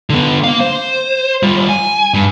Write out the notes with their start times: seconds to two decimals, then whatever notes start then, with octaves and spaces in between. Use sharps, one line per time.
0.10 D3 B3
0.44 A#3 F5
0.60 C5
1.43 G3 F4
1.69 G#5
2.14 G2